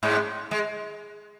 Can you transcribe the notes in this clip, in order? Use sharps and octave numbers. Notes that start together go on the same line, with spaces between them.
G#2 G#3
G#3